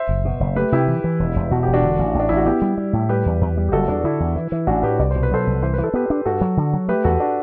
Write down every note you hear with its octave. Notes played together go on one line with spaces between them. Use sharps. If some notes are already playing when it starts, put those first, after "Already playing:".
Already playing: C5 E5
F#1
B2
F#1
A3 G4 B4
C3 E4 G4
E3
E3
E1
E1
B2 F#4
E1 G4
D4 F#4
D3
A1
A1
D4
A1 E4
F#4
B3 E4 G4
G3
G3
A2
G3 G4 B4
E2
E2
G3
G4
F#1 F#4 A4
E2 D4
D3 E4
E2
E3
E3
A1 D4 F#4
A2 G4 B4
C2 D5
B2 C5
B4
F#3 A4 C5
C2
E3 C5
E3 B4
A4
B3 G4 B4
D4
G2 F#4 A4
F#3
D3
F#3
A3 G4 B4
E2 F#4 A4
D4 F#4